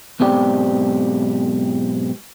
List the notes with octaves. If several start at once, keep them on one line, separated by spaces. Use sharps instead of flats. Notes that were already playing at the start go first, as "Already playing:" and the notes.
B1 G#2 B3 C4 G4 D5